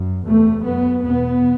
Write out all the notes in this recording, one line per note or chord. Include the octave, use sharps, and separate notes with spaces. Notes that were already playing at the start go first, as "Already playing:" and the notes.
Already playing: F#2
E2 C3 A3
F#2 B3
E2 B2 B3